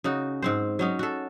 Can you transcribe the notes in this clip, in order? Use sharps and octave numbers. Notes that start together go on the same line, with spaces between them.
C#3 D#4 F#4
G#2 C4 C5
F#3 C#4 D#4
F#4 A4